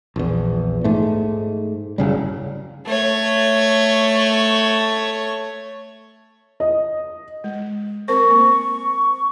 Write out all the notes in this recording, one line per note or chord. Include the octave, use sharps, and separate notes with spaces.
A#1 E2
G#2 A3
F#1 C#3 G3
A3 C#5
D#5
G#3
C4 A#4 C5 C#6
A#3